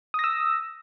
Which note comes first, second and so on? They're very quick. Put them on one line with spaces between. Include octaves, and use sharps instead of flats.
D#6 A#6 E6